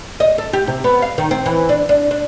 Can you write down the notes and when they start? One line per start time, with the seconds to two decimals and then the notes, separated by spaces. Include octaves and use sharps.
0.20 D#5
0.38 A4
0.53 G4
0.67 C3
0.84 B3
1.02 F5
1.18 D#3
1.31 C4
1.46 E3
1.69 D4
1.89 D4
2.11 D4